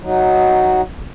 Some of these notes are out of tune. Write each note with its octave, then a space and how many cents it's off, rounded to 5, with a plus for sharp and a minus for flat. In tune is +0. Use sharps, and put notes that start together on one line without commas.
F#3 +0 D#4 +0